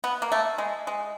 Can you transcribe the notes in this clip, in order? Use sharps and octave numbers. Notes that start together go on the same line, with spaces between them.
B3
A#3
A3
G#3
G#3